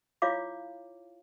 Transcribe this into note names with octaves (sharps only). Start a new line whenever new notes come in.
E4 F4 C#5 F5 D6